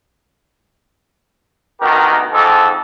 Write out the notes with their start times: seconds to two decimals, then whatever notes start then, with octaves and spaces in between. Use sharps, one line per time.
1.81 D2 B2 D#3 G4 A#4
2.33 F2 G#2 A4